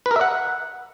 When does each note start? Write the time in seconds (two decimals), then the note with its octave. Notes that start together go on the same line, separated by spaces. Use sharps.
0.06 B4
0.11 A#4
0.16 E5
0.21 F#5